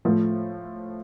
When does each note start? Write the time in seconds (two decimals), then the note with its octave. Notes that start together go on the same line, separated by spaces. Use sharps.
0.05 A2 F3 A3